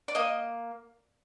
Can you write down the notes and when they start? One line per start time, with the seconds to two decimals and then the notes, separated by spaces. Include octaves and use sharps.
0.08 D5
0.15 A#3 D#5